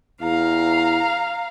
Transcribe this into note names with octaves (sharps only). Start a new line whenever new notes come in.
E2 F5 A#5